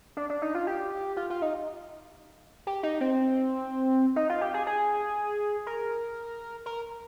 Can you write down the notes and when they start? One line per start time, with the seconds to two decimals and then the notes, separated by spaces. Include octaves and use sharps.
0.17 D4
0.30 D4
0.42 D#4
0.55 F4
0.67 G4
1.17 F4
1.30 F4
1.42 D#4
2.67 G4
2.83 D#4
3.01 C4
4.16 D#4
4.30 F4
4.41 G4
4.54 G#4
4.67 G#4
5.67 A#4
6.66 A#4